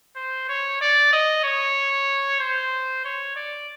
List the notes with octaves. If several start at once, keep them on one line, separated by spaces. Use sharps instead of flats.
C5
C#5
D5
D#5
C#5
C5
C#5
D5